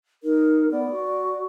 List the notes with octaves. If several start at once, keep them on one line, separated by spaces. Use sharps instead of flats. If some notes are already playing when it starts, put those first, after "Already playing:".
D#4 A#4
B3 D5
F#4